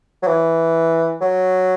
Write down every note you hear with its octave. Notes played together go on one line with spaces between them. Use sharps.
F#3
E3
F#3